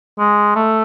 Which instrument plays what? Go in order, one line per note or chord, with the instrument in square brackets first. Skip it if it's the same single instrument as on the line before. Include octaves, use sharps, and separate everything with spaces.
[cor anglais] G#3
A3